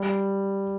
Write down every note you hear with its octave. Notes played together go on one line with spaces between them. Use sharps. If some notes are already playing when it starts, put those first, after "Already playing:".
Already playing: G3